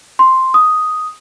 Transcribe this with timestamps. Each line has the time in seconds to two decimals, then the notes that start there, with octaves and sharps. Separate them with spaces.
0.19 C6
0.54 D#6